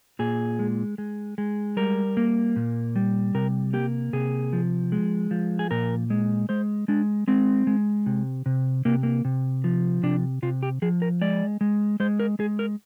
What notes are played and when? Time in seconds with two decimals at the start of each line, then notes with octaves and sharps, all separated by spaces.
0.19 A#2 G#4
0.59 G#3
0.98 G#3
1.38 G#3
1.77 G3 A#4
2.17 A#3
2.56 A#2
2.96 G3
3.35 C3 A#4
3.73 A#3 G4
4.13 C3 G#4
4.53 F3
4.92 G#3
5.31 F3
5.59 G#4
5.71 A#2 A#4
6.10 G#3
6.49 G#3 C5
6.88 G#3 D4
7.27 G#3 C4
7.67 G#3
8.06 C3
8.46 C3
8.85 C3 A#3
9.03 A#3
9.25 C3
9.64 F3
10.03 C3 D4
10.42 C3 F4
10.63 G4
10.82 F3 G#4
11.02 A#4
11.21 G#3 D5
11.61 G#3
12.00 G#3 C5
12.20 A#4
12.39 G#3 G#4
12.59 A#4